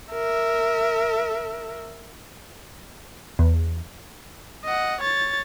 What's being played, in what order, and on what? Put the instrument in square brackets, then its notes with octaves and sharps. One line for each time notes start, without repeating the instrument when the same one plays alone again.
[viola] A#4 E5
[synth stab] E2
[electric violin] D#5 F#5
C#5 A6